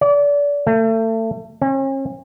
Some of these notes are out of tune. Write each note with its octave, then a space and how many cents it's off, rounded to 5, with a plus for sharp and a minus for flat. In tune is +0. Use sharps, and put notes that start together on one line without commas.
D5 -30
A3 +30
C#4 -40